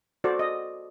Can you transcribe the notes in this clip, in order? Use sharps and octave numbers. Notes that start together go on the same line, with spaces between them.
F#4 A4 C5 D5
D#5